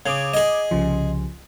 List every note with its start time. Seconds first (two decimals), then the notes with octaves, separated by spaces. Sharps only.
0.06 C#3 D6 D#6 G#6
0.34 G#4 D#5
0.71 C2 C#3 F3